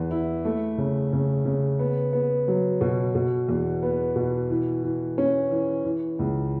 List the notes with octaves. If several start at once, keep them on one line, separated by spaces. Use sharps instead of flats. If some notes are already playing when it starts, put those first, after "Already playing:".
Already playing: E2 E3 B3
E4
A3
C#3
C#3
C#3
B3
B3
F#3
B2
B2
E2
B3
B2
E3
E3
C#4
E3
E3
C#2